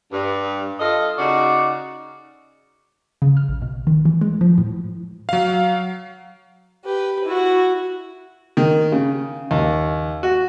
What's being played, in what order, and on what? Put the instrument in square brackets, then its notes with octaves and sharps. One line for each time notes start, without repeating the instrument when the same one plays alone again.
[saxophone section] G2
F4 A4 D#5
C#3 D#4 F#4 D5
[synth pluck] C#3
F6
A#1
B2
D#3
E3
G#3
F3
A2
[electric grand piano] F#3 F5
[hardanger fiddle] G4 B4
E4 F#4
[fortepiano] D#3
C#3
D#2
F#4